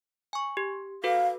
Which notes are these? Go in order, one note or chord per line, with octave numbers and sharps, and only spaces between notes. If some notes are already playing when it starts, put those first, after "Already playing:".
G#5 C#6
G4
F#4 A4 B4 F5